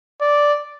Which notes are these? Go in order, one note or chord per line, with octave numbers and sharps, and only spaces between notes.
D5